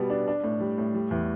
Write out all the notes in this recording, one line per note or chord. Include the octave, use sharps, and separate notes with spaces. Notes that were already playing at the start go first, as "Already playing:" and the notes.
Already playing: B2 G3 B3
D4
D4
A2
G3
A2
G3
E2